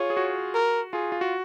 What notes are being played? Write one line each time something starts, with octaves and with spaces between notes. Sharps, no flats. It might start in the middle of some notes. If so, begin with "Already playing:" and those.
Already playing: F4 G#4 C#5
G#4
F#4
A#4
F4 G#4
F4
F#4